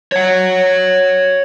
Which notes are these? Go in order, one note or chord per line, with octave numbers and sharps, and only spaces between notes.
C#5 F#5